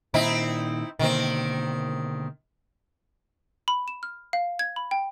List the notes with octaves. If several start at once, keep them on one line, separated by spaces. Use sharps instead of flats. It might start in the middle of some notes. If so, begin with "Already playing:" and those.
A#2 D#3 C4 D#4 E4
B2 D3 D#3 A#3 C4
B5
E7
F6
F5
G#6
B5
G5